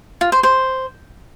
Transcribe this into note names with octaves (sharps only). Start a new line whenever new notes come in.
F4
C5
C5